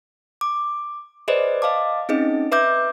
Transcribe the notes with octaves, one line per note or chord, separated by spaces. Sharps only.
D6
G#4 B4 C5 D5 D#5
D#5 F5 A5 D6
C4 C#4 D#4 G#4 D#5
B4 E5 D6 G6